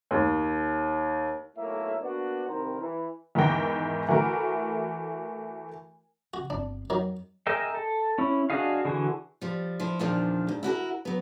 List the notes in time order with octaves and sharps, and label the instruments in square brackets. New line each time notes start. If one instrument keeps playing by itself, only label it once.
[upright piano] D#2
[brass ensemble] B1 A2 A#3 C#5 E5
A#3 B3 D4 F#4
C2 D#3 A#4 C5 A#5
E3
[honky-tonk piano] E2 G#2 D#3 E3 G5 A#6
E3 A3 F#4 A#4
[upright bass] C#3 F3 [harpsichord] F#4
[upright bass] G1 C4 [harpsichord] D4
[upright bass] F2 [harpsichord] D#3 F#3
[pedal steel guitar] G#4 A#4 D#5 E5 G5
A4
C#4 E4
D4 F#4 G#4 D#5 F5
D3 E3 F#4 G#4
[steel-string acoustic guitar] F3 G3
F3 E4
E2 A#2 D#3 F3 D4
G#2
E4 F#4 G4 A#4
F#3 B3